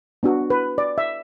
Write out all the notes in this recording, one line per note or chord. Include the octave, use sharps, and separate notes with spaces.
B3 D4 F#4
B4
D5
E5